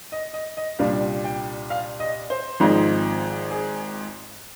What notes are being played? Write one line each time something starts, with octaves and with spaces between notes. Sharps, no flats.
D#5
D#5
D#5
C2 A#2 G3 D4 F5
G5
F5
D#5
C5
G#1 G#2 F3 C4 D#4
G#4